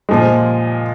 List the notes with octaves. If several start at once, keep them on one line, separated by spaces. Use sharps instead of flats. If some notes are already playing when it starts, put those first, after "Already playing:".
A#2 F3 G#3